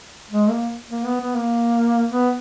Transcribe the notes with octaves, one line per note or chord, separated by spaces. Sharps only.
G#3
A#3
A#3
B3
B3
A#3
B3